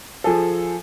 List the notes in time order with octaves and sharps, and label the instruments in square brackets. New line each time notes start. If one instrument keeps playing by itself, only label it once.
[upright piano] F3 G#4 A4